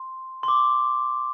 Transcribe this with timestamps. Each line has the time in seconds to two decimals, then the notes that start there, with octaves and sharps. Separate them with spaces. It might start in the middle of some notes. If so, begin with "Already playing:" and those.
Already playing: C6
0.43 C6
0.48 D6